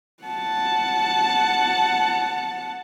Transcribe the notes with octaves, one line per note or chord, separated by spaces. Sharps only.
F#5 A5